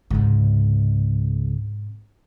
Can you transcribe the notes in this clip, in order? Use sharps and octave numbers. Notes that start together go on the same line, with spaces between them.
C#2 G#2 C3